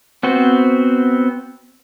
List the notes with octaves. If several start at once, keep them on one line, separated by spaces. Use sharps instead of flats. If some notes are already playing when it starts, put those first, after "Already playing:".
B3 C4 F#4 C5